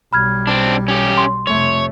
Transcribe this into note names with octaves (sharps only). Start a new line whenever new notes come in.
B1 G3 B5 F6 G#6
C4 D4
C#4 G4
C6
F1 A3 C#5